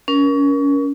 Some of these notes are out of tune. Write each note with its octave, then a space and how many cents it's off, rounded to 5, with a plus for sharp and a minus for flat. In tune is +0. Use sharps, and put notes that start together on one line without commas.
C#4 +25 A#4 +25